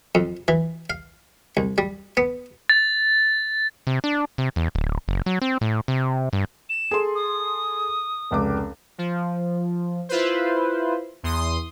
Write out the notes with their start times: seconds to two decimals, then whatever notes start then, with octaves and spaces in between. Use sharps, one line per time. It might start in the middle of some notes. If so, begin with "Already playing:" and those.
0.15 F2
0.48 E3
0.90 F5
1.57 C2
1.78 G3
2.17 B3
2.69 A6
3.87 C3
4.04 D4
4.38 C3
4.56 E2
4.75 D1
5.08 F#1
5.26 F#3
5.42 C4
5.61 A2
5.88 C3
6.33 G2
6.70 E7
6.91 G#4 A4 C6
7.15 D#6
8.31 F1 C#2 D6
8.98 F3
10.09 E4 F4 B4 C5
11.23 E2 C6 D#6